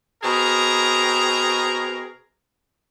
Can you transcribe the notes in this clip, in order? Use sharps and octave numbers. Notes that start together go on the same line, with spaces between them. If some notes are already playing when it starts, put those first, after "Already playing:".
B2 C4 G#4 A#4 A#5